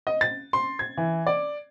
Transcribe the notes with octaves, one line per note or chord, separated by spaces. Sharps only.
D#5
A6
C6
G#6
E3
D5